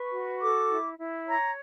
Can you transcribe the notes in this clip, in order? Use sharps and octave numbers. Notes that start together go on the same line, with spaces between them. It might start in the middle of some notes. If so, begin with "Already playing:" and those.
Already playing: B4 C#6
F#4
A4 D6
E4
E4
C#5 A#5